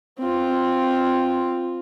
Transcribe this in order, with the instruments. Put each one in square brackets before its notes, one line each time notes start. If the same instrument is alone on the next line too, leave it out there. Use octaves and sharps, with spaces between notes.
[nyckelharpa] C4 F4